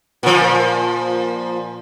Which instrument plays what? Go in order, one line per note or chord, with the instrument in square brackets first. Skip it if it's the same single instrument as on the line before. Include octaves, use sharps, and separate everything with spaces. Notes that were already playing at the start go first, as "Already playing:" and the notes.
[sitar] A#2 F3